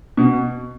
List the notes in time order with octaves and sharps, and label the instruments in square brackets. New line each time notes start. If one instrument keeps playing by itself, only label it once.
[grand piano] B2